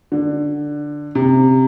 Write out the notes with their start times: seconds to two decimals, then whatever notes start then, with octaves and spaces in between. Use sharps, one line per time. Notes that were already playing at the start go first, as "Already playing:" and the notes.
0.12 D3
1.15 C3